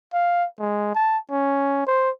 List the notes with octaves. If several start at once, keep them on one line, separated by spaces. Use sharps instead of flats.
F5
G#3
A5
C#4
C5